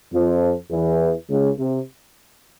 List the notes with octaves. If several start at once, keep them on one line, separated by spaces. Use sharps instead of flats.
F2 F3
E2 E3
C#2 C#3
C3